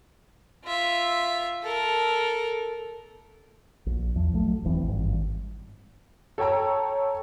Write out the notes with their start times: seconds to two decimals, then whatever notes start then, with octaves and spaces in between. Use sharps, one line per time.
0.65 F4 E5
1.63 A4 A#4
3.86 A#1
4.15 E2 F3
4.33 A#1 F#3 A3
4.64 E1 E3 C4
4.83 G#1 G2
6.38 A4 C#5 G5 A#5 E6